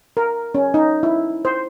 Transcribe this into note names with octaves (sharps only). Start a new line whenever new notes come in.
A#4
C#4
D#4
E4
C5